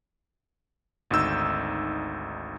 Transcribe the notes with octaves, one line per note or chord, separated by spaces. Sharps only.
G#1 D2 D#4 E6 G6